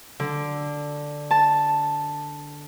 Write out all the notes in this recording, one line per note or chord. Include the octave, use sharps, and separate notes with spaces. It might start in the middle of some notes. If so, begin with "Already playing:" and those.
D3
A5